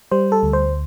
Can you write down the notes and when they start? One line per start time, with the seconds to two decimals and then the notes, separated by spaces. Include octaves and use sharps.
0.11 G3 C5
0.32 A4
0.43 D2
0.53 C5